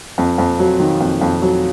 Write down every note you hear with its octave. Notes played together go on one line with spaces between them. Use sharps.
F2
F2
F#3
D#3
F2
F2
F#3